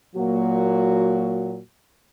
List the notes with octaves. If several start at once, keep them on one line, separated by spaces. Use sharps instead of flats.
A#2 F#3 A#3 F#4